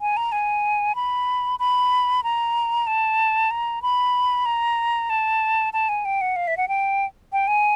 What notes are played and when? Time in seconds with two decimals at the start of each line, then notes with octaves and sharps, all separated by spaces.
0.01 G#5
0.17 A#5
0.32 G#5
0.95 B5
1.59 B5
2.24 A#5
2.87 A5
3.51 A#5
3.82 B5
4.46 A#5
5.10 A5
5.73 A5
5.89 G#5
6.05 G5
6.21 F#5
6.36 F5
6.47 E5
6.57 F#5
6.68 G5
7.33 G5
7.48 G#5